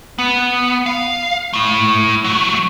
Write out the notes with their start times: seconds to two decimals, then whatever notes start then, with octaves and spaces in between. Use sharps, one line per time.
0.19 B3
0.86 F5
1.53 A3 E4
2.24 F#3 A3